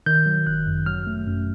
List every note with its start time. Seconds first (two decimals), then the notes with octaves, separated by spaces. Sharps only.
0.06 D#3 G6
0.26 F#3
0.46 G1 F#6
0.66 F#2
0.86 F#3 F6
1.07 A3
1.27 F#2